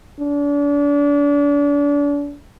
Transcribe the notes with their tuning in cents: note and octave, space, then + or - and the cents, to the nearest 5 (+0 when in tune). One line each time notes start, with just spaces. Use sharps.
D4 -35